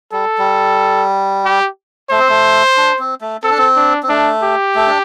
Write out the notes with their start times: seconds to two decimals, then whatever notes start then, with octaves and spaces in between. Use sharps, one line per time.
0.13 G3 A4
0.38 G3
1.45 G4
2.10 A3 C5
2.19 C4
2.29 A3
2.77 D4
2.99 C4
3.21 A3
3.43 C4 A4
3.51 D4
3.58 C4
3.76 D4
4.03 C4
4.09 A3 D4
4.42 G4
4.75 A3
4.87 D4